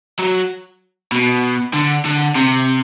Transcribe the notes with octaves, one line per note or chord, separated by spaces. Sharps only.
F#3
B2
D3
D3
C3